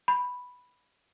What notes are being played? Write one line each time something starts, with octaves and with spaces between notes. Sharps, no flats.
B5